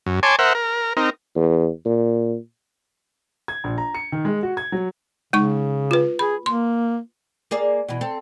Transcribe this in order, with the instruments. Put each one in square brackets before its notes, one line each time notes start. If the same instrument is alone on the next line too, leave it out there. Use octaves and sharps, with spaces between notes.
[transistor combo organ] F#2
C#5 G#5 A5 C6 D6
A#4 C5 E5 F#5
A#4
C4 D#4 A#4
[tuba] E2
A#2
[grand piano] G#6
A#1
A#5
C#7
D#3
G#3
F#4
G#6
F#3
[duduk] C#3 [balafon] G#3 D#4 C#6
[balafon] F4 B4
[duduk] G#4 [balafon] B5
[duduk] A#3 [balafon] C6
[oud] A#3 G#4 D5
B2 E3
C4 A4